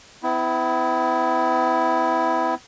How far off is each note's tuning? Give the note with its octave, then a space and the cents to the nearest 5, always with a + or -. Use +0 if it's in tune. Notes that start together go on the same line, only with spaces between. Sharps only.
B3 +45 E4 +0